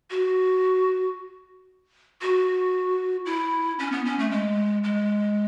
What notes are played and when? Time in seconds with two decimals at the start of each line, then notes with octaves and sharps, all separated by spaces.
0.11 F#4
2.22 F#4
3.26 E4
3.79 C#4
3.92 B3
4.05 C#4
4.19 A3
4.31 G#3
4.84 G#3